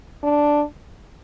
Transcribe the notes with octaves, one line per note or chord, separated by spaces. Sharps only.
D4